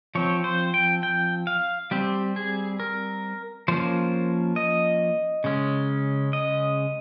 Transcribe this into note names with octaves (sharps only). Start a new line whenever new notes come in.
F3 C4 C#5
C5
G5
G5
F5
G3 C4 G4
G#4
A#4
F3 A#3 C#4 C5
D#5
C#3 G#3 C#4
D#5